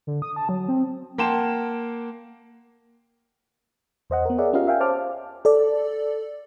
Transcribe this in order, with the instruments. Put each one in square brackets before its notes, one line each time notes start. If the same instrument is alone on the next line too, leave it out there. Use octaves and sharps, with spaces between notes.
[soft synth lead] D3
D#6
A5
F#3
C4
[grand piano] A#3 F#5 G5 A5 C6 E7
[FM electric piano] E2 C5 D#5 F#5
B3 A#4
G#4 A#4 C#5 D5 E5 F#5
C#4 F4 G4 A#4 D#5 F5
E5 F5 G5 G#5
C5 C#5 A5 D6 F6
A4 D5